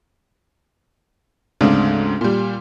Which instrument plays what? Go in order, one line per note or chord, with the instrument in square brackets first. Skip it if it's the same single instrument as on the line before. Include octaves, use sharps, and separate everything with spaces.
[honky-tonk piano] D2 G#2 C#3 C4 D4
A#2 G3